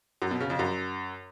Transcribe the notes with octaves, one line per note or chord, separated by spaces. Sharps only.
F#2
B2
C#3
F2
F#2